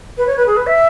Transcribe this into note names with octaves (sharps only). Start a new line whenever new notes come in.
B4
C#5
B4
G#4
B4
E5